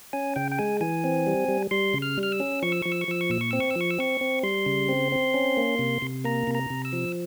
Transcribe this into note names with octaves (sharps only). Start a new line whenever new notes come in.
C#4 G#5
C#3 G5
G5
G#3 G#5
E3 G#5
C4
G3
G3
G3 C6
C#3
F6
G3
F6
E6
C#4
F3 C#6
E6
F3 C#6
E6
C#6
F3 E6
C#6
A#2 E6
C#6
C4 E6
C#6
E6
F3
C#6
E6
C4 C#6
C4
G3 C6
C#3
C4
C4
C#4
A#3
C3
C3
A#3 A#5
C3
A#5
C3
E6
F3